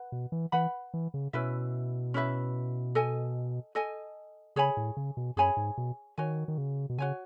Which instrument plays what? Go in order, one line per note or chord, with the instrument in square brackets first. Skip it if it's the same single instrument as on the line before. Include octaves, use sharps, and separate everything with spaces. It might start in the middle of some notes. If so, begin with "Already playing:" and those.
Already playing: [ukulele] B4 F#5
[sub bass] B2
E3
[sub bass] E3 [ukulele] B4 F#5 B5
[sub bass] E3
C#3
[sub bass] B2 [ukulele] C#4 E4 B4 E5
[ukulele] C#4 E4 B4 E5
A4 D#5 G#5
A4 D#5 G#5
[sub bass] C#3 [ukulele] G#4 C#5 G#5 B5
[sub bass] A2
C#3
B2
[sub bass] F#2 [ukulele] G#4 C#5 G#5 B5
[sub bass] G#2
B2
[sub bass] D#3 [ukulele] F#4 C#5 G#5
[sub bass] D#3
C#3
B2
[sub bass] C#3 [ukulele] F#4 C#5 G#5